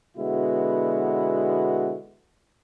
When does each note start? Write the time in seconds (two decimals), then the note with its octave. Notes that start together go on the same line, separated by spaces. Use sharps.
0.17 B2 D3 G#3 B3 E4 F#4